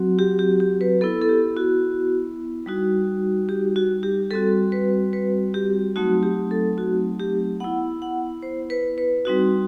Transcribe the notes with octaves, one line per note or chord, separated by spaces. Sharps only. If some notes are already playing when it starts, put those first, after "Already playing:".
Already playing: F#3 C4 F#4
G4
G4
G4
B4
B3 E4 A4
A4
G4
F#4
G3 D#4 F#4
G4
F#4
G4
G3 C4 F#4 A4
B4
B4
G4
F#3 A3 C4 D#4 F#4
G4
A4
F#4
G4
B3 E4 F#5
F#5
C5
B4
B4
G3 C4 D#4 F#4